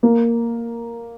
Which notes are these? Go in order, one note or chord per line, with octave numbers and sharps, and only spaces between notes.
A#3